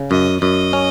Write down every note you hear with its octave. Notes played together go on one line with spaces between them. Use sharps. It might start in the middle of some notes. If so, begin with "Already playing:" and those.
Already playing: C#3
F#2 D#5
F#2 D#5
C#4